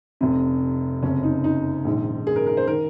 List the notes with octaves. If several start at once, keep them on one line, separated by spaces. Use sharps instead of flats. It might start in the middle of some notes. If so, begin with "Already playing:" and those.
F1 F2 C3
F#1 F2 C3 C#4
D#4
D#4
A#1 G#2 D#3
G#4
A#4
A#4
C5
D#3 A#4